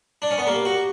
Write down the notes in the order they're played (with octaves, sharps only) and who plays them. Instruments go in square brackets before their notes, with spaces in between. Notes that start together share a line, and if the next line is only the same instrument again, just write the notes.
[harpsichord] D4
C#4
B3
[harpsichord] A#3 [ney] G4
[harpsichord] F#4